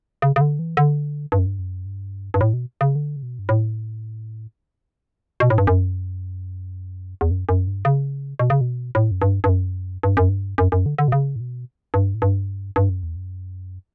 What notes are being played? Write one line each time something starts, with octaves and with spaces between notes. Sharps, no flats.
C#3
C#3
D3
E3
D3
G2
F#2
G2
F#2
G2
G2
A2
B2
C#3
D3
C#3
B2
G2
A2
B2
A2
G2
F#2
E2
F#2
F#2
G2
C#3
B2
C#3
B2
A2
F#2
G2
G2
F#2
G2
F#2
G2
F#2
F#2
D3
D3
B2
C#3
A2
B2
G2
A2
G2
G2
F#2
E2
F#2